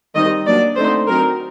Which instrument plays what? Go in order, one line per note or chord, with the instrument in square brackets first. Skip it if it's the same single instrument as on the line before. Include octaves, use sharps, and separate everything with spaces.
[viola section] D#3 G3 C4 D#4 D#5
F#3 A#3 D4 D5
D3 A3 C4 D#4 C5
F#3 C4 D#4 A#4